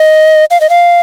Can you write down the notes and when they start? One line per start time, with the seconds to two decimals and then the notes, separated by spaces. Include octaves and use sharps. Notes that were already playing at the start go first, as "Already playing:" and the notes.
Already playing: D#5
0.51 F5
0.61 D#5
0.70 F5